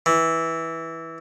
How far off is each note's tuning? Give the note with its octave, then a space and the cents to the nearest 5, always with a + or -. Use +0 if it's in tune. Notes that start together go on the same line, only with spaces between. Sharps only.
E3 -10